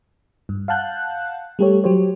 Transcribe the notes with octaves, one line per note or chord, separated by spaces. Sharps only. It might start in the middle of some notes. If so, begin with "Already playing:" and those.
G2
F5 F#5 A5 F#6 G6
G3 A3 G4 A4 C#5
F#3 G4 C5 C#5